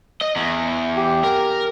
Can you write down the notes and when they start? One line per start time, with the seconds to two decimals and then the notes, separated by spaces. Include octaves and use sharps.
0.22 D#5
0.36 E2
0.96 G4
1.24 A#4